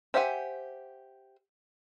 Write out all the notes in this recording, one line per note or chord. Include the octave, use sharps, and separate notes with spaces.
G4 C5 E5 F#5 G#5